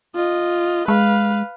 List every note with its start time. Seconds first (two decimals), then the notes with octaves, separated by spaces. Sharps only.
0.15 F4 D#5
0.88 G#3 B4 F5